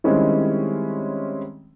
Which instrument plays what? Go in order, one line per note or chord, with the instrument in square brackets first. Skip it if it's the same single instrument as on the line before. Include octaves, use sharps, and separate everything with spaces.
[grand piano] D#3 G3 G#3 C4 C#4 E4